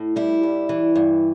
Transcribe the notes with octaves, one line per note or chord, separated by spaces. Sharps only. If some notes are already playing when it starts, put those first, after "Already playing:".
Already playing: A2
G3 E4
G2
E3
G2